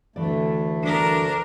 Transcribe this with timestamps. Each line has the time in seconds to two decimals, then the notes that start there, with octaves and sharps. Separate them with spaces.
0.16 D2 E3 A3 D5
0.83 D4 A#4